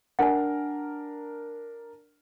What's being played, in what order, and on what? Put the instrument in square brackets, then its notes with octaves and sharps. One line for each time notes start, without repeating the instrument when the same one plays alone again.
[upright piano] D4 A#4 [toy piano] F#5 G#5